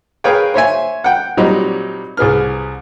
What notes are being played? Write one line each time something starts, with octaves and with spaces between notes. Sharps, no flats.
G#4 A#4 B4 C#5 F5 G5
C5 C#5 E5 G#5
F#5 G5
A#2 F#3 G3 C4 D#4
C2 G#4 B4 F6